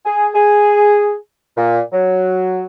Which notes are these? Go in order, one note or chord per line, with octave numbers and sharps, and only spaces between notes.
G#4
G#4
A#2
F#3